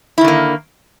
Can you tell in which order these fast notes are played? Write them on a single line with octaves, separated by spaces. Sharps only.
E4 D#3 D3 A#3